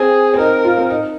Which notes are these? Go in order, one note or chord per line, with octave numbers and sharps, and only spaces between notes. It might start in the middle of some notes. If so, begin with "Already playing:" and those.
Already playing: C4 G#4
C4
D#4 A#4
F4
C4
D#4